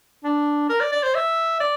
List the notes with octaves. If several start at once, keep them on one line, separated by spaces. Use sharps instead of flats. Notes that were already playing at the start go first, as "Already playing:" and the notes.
D4
A#4
D5
D5
C5
E5
D5